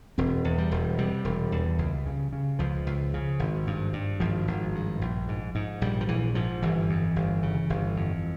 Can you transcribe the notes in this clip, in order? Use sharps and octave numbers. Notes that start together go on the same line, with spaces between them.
E1 C4
E2
G3
E1
C3 G3
E1
E2
C#2
C#3
C#3
C#2 F3
C#2
C#3
G#1
G2
G2
G#1 F3
G#1
G2
A#1
G#2
G#2
A#1 G3
F3
A#1 E3
G#2 F3
G1 E3
F2
G1
C#3
G1
F2